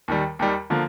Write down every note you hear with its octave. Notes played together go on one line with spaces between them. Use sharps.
D#2 D#3 G3
D#2 D#3 G3
D3 F3 A#3